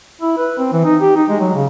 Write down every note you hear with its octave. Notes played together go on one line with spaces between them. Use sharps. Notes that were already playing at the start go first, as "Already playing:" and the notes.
E4
B4
C4
E3
D#4
G4
D#4
G#3
F#3
C#3